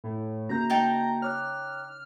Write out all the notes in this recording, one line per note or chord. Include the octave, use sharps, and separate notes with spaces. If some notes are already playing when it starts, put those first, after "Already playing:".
A2
C#3 A#3 F#4 A#5 G6
D#4 G5 A5
C#5 D6 F6 F#6